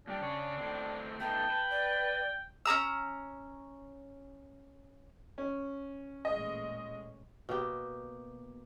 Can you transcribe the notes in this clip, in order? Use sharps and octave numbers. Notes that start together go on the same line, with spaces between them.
A#2 G3 D4 G5
C#3 C#5
A2 C4
A3 B3 D#4 G5 A5
B4
D5
C#4 G#4 A#5 E6
C#4
A1 A#2 G#3 D#5
B2 A#3 G4